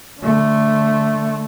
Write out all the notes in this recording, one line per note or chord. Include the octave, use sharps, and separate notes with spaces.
D3 A3